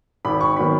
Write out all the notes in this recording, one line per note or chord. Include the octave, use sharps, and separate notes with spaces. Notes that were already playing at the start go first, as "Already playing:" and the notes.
G#1 B5
C#6
D#3 F#3 B3 B5